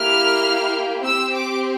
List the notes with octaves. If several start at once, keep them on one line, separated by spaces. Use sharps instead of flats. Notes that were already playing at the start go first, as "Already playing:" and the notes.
Already playing: A#3 E4 G4 F6
C4 G4 E6
D6